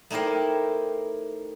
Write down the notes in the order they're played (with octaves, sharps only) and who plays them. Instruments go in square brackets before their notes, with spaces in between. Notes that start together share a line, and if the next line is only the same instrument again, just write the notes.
[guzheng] A3 D#4 E4 G4 A#4 C5